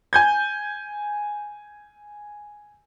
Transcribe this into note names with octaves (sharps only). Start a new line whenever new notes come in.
G#5 G6 G#6